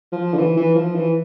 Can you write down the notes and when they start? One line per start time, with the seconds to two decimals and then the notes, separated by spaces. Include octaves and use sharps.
0.13 F3
0.34 D3
0.38 E3
0.57 E3
0.75 F3
0.95 E3